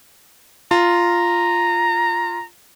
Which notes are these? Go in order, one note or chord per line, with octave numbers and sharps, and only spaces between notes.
F4 A#5